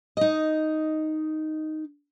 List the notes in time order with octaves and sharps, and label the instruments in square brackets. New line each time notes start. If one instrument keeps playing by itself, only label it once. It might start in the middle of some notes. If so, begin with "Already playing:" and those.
[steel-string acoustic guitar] D#4 D#5